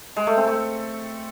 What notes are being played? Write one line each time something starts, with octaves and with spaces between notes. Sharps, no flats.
G#3
A3
C4
A3